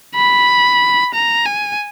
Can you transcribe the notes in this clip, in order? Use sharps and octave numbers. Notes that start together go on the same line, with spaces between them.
B5
A#5
G#5